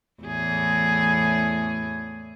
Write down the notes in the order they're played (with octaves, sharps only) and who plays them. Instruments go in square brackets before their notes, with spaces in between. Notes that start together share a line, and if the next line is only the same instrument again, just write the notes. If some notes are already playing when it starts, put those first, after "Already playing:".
[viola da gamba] E2 A2 G#4